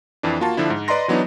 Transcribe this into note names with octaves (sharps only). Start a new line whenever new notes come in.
F2 E3 D4
A#3 F4 F#4 A5
D3 F3 D4 E4
G#2
B4 D5 D#5 A#5 C6 A#6
E3 F#3 B3 D4 D#4